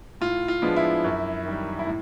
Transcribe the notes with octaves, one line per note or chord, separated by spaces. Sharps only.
A2 F4
F4
F3 G#3 B3 D4
E4
F#2
D#3 G3
E4
A2